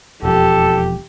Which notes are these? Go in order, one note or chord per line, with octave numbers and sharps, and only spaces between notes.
E1 F2 G4 A4